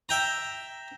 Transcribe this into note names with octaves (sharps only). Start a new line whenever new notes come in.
E5 G5 A#5